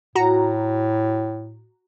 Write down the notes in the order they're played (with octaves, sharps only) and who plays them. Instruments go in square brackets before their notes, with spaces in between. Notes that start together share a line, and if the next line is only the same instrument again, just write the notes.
[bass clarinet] A2 [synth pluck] F#4 A#5